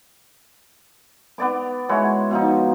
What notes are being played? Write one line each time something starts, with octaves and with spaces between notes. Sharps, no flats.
B3 D5 D6
G#3 E4 F#4 C#5
B2 F3 D#4